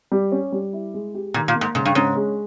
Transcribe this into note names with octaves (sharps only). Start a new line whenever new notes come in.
G3
C#4
G3
E4
G#3
G4
A#2 D#3
A#2
A#3
G#2
G#2 C#3
G2
G#2 C#4
G#3